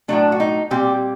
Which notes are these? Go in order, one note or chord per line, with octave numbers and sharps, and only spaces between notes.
A2 F#3 A3 D4
F#4
D#4
A#2 G3 C4 G4